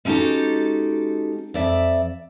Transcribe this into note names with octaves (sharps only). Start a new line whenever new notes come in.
G#3 C#4 D#4 F#4 G4 A4
F2 D5 E5